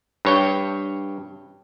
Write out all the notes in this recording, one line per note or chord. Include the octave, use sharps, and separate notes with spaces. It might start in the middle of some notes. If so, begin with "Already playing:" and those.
G2 C#5 G5